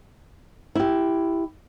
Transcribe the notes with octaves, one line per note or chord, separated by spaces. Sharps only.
E4 G4